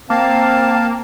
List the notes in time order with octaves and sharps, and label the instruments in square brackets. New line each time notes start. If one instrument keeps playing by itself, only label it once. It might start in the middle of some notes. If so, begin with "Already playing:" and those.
[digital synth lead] A#3 [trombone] C4 [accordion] F5 A5 [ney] G5